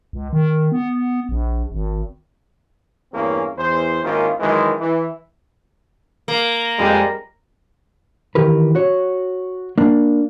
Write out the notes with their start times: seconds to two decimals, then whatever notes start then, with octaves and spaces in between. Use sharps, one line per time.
0.13 C#2
0.33 D#3
0.72 B3
1.29 A#1
1.72 G#1
3.13 E2 G2 A#3 C4 C#4
3.57 E2 C5
4.03 G#1 D#3 A#3 C#4 E4 F4
4.40 F#2 D#3 E3 G#3
4.78 E3
6.28 A#3
6.79 F2 G3 G#3
8.35 D#3 E3 G4 A#4 B4
8.75 F#4 C#5
9.78 A#3 D4